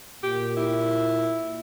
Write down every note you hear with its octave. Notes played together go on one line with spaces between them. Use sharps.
A#2 G4
E4